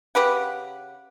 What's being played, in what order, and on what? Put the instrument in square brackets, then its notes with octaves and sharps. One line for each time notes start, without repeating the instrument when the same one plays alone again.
[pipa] C#3 G4 B4 F#5